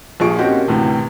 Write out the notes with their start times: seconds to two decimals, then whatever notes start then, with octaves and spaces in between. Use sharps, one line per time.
0.20 A#1 A#2 F3 G#4 C#6 D7
0.38 A#3 C4 C#4 D#4 F#4 G4
0.68 D2 A2 C3 E3